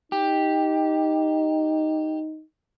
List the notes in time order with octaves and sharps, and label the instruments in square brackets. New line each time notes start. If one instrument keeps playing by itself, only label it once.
[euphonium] D#4 [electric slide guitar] G4